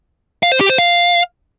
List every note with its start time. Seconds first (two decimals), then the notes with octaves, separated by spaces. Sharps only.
0.43 F5
0.52 C5
0.61 G4
0.70 C5
0.78 F5